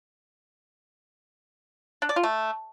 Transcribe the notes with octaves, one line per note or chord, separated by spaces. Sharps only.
D4
D5
F4
A3